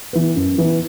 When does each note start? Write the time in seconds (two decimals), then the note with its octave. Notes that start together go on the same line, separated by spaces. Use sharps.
0.13 E3 B3
0.36 F#2
0.58 E3 B3